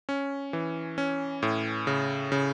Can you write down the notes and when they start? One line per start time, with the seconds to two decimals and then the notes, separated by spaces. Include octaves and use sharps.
0.09 C#4
0.53 E3
0.98 C#4
1.43 A2
1.87 C#3
2.32 C#3